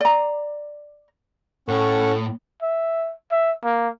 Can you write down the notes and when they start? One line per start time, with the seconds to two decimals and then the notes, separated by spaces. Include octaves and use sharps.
0.01 D5 A#5
1.68 A2 C#4 A4 F#5 C#6
2.63 E5
3.32 E5
3.64 A#3